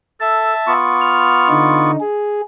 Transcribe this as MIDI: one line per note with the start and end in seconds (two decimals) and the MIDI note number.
0.20 0.54 69
0.20 0.73 76
0.20 0.73 81
0.67 1.91 59
0.67 1.91 65
0.67 1.91 85
1.01 1.47 89
1.49 1.96 50
1.49 1.96 63
2.00 2.42 68